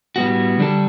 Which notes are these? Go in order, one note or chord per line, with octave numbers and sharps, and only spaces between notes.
A2 G3 B3 F#4
D3 G3 D4 A4